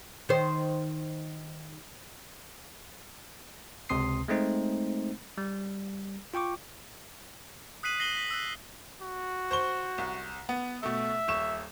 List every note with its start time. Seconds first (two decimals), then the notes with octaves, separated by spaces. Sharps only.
0.29 D#3 C5
3.89 C#2 C3 C4 C6 D#6 C7
4.28 G#3 A3 C4 D#4 C5
5.38 G3
6.34 F4 G5 C#6 D6
7.83 D#6 F#6 B6 C7 D#7 F#7
8.00 A#6 C7 F#7 G7
8.17 B6
8.31 E6 F#6
9.02 F#4
9.51 C5 C#6 G7
9.98 C2
10.49 B3
10.83 B2 A3 E5
11.28 D#1 C#6 E7